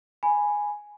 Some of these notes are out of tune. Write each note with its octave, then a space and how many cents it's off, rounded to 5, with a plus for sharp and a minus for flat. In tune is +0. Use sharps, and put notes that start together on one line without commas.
G#5 +0 B5 -5